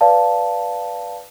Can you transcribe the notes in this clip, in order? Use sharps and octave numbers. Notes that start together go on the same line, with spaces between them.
B4 D5 F5 A5